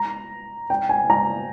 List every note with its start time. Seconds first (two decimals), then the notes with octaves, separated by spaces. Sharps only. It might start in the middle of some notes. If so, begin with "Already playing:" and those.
Already playing: A#5
0.70 G5
0.89 G#5
1.10 A#5